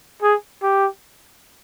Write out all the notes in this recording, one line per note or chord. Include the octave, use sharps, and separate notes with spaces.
G#4
G4